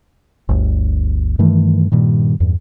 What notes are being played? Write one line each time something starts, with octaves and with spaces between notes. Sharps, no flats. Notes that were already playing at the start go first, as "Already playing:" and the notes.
G1 D2
G2 D#3 E3 A3
G2 A#2 D#3
E2 G2